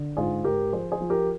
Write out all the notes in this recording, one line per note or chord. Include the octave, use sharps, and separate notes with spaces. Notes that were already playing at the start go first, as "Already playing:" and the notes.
Already playing: D3
G#2 F4 G#4
G#2 G4 A#4
F3 G#4 C5
G#4 C5
F3
G4 A#4